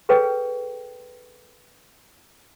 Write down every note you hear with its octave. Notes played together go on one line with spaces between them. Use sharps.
G#4 A4 B4 C#5 G5